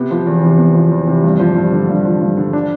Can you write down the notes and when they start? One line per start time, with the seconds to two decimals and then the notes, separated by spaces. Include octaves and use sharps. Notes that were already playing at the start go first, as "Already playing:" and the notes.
Already playing: C3 B3
0.11 F3
0.27 E2
0.43 C3
0.58 B3
0.75 F3
0.91 E2
1.08 C3
1.24 G2
1.40 F3
1.56 G2
1.73 D3
1.89 G2
2.05 F3
2.21 G2
2.37 D3
2.53 D4